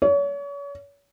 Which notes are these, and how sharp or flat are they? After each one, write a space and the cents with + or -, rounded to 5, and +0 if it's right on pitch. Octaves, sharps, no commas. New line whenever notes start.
C#5 +35